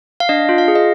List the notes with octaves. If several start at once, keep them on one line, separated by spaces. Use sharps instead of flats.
F5
D4 D#5
F4
F5
G#4
D#5